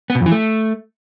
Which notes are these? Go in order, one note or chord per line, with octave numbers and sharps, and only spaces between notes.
B3
B2
F2
E3
A3